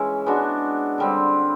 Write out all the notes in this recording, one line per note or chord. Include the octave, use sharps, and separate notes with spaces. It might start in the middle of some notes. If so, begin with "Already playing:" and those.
Already playing: E3 G#3 C#4 E4
G#3 B3 D4 F#4
D3 G3 C4